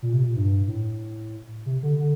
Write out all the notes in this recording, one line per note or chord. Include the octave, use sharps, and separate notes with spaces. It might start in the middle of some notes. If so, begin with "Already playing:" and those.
A#2
C3
A#2
G2
A2
C3
D3
D3